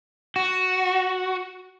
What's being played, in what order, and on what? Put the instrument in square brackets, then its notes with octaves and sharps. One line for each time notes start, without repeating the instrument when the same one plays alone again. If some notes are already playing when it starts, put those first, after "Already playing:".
[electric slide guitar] F#4